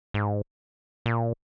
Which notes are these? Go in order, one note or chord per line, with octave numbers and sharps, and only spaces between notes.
G#2
A#2